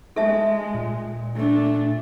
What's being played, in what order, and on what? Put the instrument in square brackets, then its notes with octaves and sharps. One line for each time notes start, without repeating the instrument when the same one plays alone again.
[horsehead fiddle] G#3 [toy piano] A4 E5 A5
[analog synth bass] A#2
[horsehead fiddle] A3 D4